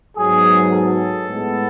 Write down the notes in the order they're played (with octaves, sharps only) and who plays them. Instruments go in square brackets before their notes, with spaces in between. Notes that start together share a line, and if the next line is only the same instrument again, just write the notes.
[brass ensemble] G#2 F#3 B3 G#4
A4
A2 G#3 B3